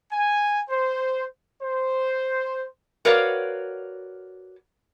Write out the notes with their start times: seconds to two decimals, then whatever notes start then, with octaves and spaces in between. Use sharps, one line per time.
0.11 G#5
0.70 C5
1.63 C5
3.05 F#4 A#4 B4 C#5 D5 F5